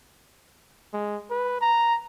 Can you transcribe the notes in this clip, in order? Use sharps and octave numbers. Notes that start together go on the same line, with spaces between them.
G#3
B4
A#5